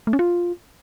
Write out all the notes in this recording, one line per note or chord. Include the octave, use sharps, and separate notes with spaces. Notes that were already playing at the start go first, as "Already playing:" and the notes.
A3
C#4
F4